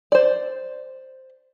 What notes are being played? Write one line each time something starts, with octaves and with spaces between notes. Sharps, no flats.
C5 D5